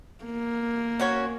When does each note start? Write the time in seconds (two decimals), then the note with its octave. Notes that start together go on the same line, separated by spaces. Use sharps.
0.25 A#3
1.00 C#4 F#4 C#5